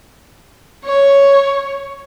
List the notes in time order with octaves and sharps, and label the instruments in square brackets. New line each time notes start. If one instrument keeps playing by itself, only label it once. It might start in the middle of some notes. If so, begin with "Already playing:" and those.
[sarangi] C#5